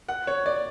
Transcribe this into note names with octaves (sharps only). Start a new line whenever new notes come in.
F#5
C#5
D5